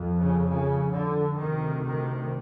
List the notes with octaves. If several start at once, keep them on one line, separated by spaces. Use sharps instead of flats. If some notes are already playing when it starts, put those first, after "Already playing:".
Already playing: F2
C#3
C#3
D3
D2 C3 D#3
D#3